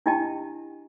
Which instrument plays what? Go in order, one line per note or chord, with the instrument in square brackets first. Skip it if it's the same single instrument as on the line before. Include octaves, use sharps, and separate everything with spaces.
[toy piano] D4 E4 G4 D#5 G5 A5